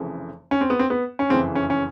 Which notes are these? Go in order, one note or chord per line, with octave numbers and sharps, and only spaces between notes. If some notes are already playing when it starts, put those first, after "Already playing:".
Already playing: F1 F2 C#3 E3
C#4
C4
B3
C4
B3
C#4
F#1 F2 C#3 E3 C4
C#4
C#4